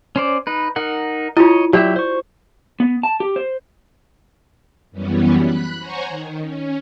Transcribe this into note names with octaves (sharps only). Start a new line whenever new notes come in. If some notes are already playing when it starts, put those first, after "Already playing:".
C#4 C5 D5
D#4 B4
D#4 A#4 F#5
E4 F4 C#5 D#5
F#3 F#4 G4 D5 E5
C5 C#6
B3
A5
G4
C5
F#2 E3 G3 B3 C#4
B5 F#6
C5 C#5 F#5 G#5 A#5 C#6
D#3
C#4